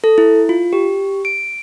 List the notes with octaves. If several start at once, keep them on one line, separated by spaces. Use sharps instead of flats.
A4
E4
F4
G4
D7